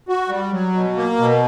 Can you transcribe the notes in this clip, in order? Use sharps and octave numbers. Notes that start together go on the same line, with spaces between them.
F#4
G3
F#3
B2
A#3
B2